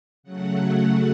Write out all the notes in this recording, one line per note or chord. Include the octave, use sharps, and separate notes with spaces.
C#3 F#3 A3 F#5